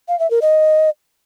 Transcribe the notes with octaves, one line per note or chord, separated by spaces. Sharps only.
F5
E5
A#4
D#5